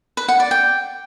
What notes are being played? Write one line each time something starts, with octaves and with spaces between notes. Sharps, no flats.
B4
F#5
D5
G5